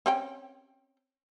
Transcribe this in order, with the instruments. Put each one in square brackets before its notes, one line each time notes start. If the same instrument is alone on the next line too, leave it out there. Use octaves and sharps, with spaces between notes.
[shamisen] C4 C#4 G5